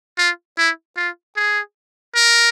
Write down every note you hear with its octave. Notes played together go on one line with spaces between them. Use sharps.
F4
E4
F4
G#4
A#4